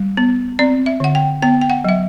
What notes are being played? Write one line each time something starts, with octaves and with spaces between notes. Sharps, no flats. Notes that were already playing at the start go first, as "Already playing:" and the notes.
Already playing: G3
B3
C4 D5
E5
D3 F#5
G5
B3 G5
G5
F#5
F#3 E5